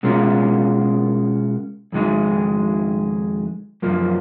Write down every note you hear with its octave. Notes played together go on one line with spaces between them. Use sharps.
B2 G#3 C#4 F4 A#4
F2 D#3 G#3 D#4
F#2 F3 A#3